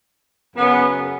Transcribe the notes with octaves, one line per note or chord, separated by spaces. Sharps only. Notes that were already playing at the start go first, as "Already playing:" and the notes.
F#2 C#3 F#3 B3